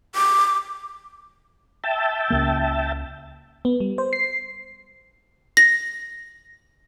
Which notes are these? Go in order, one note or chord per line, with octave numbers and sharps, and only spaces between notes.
D6
E5 G5 A5
C#2 A#3
B3
G3
C5
C7
A#6